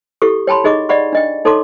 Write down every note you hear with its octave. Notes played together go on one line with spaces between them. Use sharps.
E4 G4 A4 C#6
C#5 G5 A5 B5 C6
D#4 G#4 D#5 C#6 D6
D5 D#5 F5 F#5 B5 C#6
D4 D#5 G5
D#4 A4 C#5 A5 C6 D6